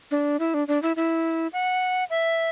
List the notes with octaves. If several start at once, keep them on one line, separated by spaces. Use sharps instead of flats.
D4
E4
D4
D4
E4
E4
F#5
E5